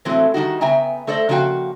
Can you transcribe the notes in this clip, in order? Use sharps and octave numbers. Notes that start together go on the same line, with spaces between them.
A2 E3 F#3 G#3 A3 C4
D#3 G3 D#4 F#4
C#3 B3 E5 G5 G#5 A#5
A3 A4 C5 D5 D#5
C#3 F3 A#3 F#4 F5 G5